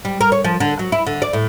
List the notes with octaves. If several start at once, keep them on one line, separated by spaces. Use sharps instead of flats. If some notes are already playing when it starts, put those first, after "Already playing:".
G3
A#4
C#5
F3
D3
F#3
E4
D3
D5
A2